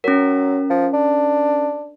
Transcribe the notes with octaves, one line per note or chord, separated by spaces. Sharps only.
F#3 C#4 A#4
F3
D4